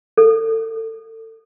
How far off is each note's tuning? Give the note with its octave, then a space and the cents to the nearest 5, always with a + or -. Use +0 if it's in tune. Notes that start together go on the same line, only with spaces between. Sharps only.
A4 +20